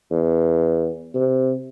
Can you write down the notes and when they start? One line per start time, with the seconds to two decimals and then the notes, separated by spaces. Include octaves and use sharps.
0.11 E2
1.15 C3